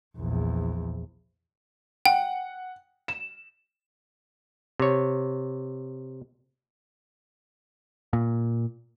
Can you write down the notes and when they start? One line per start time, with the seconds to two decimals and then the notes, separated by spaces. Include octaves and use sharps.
0.17 A#1 E2
2.05 F#5 G5
3.08 E7
4.80 C3 C#5
8.13 A#2